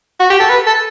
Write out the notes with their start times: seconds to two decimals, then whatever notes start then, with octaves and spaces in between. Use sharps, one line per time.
0.20 F#4
0.30 G4
0.40 A4
0.50 B4
0.67 A4